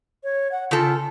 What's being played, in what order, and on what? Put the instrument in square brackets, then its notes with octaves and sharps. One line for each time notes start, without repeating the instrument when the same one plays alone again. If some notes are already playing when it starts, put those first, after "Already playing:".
[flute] C#5
F#5
[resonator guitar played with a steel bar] C#3 A4 [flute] F4